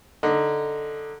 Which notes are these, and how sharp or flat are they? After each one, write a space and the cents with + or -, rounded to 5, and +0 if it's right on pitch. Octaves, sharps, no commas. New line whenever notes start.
D3 +0 D#4 -5